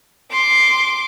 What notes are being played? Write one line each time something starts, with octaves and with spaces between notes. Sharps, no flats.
C6 D6